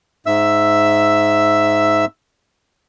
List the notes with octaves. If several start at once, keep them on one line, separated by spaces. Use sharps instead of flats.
G#2 E5 E6